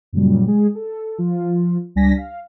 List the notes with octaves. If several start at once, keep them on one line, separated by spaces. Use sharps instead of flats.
F#2 A#2 C#3 F#3 G3
G#3 G#4
A4
F3 F4
C#2 G3 D4 G#5 A#6 B6
F5